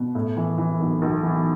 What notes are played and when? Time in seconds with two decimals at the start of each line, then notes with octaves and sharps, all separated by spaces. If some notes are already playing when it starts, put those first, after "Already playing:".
Already playing: B2
0.15 A2
0.37 E3
0.58 E3
0.80 B1
1.02 B1
1.23 E3